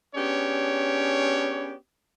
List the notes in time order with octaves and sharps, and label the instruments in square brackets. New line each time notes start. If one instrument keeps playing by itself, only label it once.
[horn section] B3 C#4 D4 G4 G#4 C#5